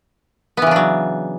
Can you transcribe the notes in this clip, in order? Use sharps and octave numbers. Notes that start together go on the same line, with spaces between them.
C#3 E3 F#3 B3 D4